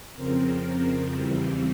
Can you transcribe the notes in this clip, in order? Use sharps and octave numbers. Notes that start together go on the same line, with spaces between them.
F2 C#3 F3 C4 A#4
E2 C#3 E3 G3 C4